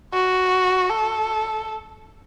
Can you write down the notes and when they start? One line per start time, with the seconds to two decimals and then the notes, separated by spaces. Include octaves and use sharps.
0.14 F#4
0.90 A4